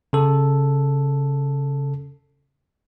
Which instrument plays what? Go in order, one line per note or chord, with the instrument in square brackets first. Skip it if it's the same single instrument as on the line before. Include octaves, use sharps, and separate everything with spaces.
[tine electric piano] C#3 A4